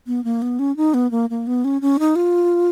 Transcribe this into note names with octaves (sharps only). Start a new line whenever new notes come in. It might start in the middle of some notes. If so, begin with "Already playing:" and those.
B3
A#3
B3
C#4
D#4
B3
A#3
A#3
B3
C#4
C#4
D#4
F4